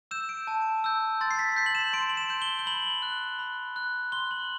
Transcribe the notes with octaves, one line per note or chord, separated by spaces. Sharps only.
E6 G6 E7
D7
A5
E6 G6
C6 A6
C7
B6
G6 C7
F#7
E7
C6 D7
F#7
E7
G6
G7
G7
B5 F#7
F#6
B5
F#6
C6 G7
F#7